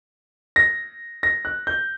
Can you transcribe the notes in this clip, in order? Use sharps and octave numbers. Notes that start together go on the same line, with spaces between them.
A#6
A#6
F#6
G6